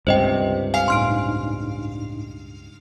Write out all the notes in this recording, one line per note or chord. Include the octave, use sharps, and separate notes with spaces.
C#2 G2 C3 C5 D#5 G5
F5 G#5
A2 D4 D#4 C6 F6 D7